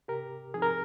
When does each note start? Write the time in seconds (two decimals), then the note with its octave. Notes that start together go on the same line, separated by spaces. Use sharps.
0.08 C3 G4 A#4
0.54 F3 C4 D#4 G#4
0.62 A#4